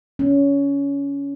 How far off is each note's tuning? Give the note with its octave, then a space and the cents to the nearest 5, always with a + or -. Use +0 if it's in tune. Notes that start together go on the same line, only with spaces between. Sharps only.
C#4 +20